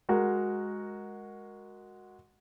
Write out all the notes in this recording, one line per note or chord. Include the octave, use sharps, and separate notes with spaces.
G#3 F#4 A#4